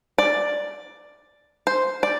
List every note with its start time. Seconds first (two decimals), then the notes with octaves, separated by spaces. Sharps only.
0.18 D5
1.67 C5
2.03 D5